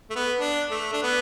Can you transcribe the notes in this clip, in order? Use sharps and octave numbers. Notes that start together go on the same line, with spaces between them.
A3
B3
D4
A3
D4
B3